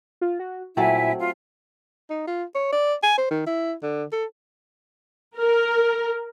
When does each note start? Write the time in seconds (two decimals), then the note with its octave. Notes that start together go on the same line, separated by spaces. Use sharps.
0.21 F4
0.39 F#4
0.77 A#2 F#3 A3 C4 E4 E5 G#5
1.19 F4
2.10 D#4
2.27 F4
2.55 C#5
2.72 D5
3.03 G#5
3.18 C5
3.30 D#3
3.47 E4
3.82 D3
4.12 A4
5.36 A#4